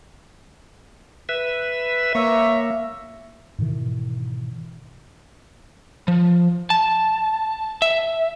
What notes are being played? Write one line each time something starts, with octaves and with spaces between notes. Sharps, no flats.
B4 E5
A#3 C#5 E5
G#2 B2 D#3 E3
F3
A5
E5